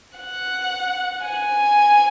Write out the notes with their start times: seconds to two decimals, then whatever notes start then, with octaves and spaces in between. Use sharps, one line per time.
0.18 F#5
1.25 G#5